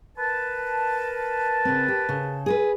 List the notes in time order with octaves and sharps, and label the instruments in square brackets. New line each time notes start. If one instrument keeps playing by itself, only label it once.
[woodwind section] A#4 B4 A5
[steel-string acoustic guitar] C#3 C4
G4
C#3
G#4 A#4 B4